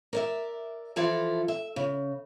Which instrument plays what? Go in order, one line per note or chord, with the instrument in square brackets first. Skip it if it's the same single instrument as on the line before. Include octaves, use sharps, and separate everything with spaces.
[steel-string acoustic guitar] A#4 D5 E5
E3 F3 E4 F4 A4 D5
E5
C#3